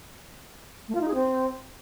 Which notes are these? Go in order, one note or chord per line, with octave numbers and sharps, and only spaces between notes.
A3
F4
D#4
G#4
C4